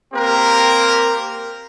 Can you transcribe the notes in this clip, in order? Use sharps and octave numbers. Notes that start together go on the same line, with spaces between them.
A#3 C4 G4 A#4